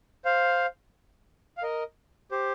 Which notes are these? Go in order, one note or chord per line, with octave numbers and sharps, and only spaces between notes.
C5 F5
F5
A#4 D#5
G4 C5